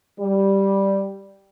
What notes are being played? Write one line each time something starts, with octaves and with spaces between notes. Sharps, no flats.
G3